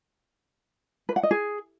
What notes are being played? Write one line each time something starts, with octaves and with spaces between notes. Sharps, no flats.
B4
F#5
D#5
G#4